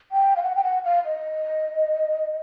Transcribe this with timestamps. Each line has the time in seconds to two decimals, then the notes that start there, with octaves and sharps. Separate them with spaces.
0.12 G5
0.36 F5
0.43 F#5
0.56 G5
0.64 F#5
0.85 F5
1.06 D#5